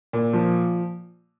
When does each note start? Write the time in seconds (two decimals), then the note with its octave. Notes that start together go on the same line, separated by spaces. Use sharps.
0.13 A#2
0.33 F3